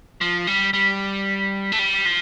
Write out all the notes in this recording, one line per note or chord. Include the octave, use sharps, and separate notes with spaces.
F3
G3
G3
A3
G3
F3